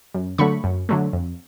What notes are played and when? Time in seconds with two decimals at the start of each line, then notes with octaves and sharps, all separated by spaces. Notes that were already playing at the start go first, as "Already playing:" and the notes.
0.15 F#2
0.38 D3 F#3 A3 B5 C#6
0.64 F#2
0.89 D3 F#3 A3
1.13 F2